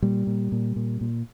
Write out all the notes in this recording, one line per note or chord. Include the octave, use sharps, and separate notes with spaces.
A#2 G3
A#2
A#2
A#2
A#2